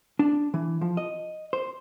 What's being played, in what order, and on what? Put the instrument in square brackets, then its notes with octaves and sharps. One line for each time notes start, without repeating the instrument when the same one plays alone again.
[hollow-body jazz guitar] D4
E3
F3
D#5
C5